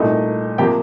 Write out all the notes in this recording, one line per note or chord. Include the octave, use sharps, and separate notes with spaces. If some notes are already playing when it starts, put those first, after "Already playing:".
Already playing: C2 A#2 A3 D#4 D#5
C3 F3 A#3 G4 G5